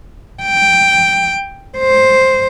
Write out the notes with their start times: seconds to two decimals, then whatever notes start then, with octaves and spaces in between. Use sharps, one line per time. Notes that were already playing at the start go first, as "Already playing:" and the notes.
0.43 G5
1.78 C5